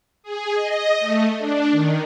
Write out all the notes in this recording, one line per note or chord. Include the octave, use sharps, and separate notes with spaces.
G#4
D#5
A3
D4
D#3